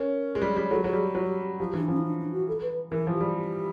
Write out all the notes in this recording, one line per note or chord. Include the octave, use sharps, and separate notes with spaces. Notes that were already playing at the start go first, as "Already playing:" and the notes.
Already playing: C#4 A#4
G#3
G3
G3
G#4
F#3 A4
F#3 G#4
G3
G4
F#3
F3 G4
E3 D4
F3 C#4
D#4
D4
D4
F#4
A4
B4
E3 A#4
F3
G4
G3
G4